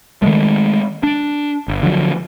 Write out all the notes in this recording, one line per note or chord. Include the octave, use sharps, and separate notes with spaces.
D#3 F3 G#3 A3
D4
G1
D3 F3 F#3